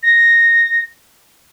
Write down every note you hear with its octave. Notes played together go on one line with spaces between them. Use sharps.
A#6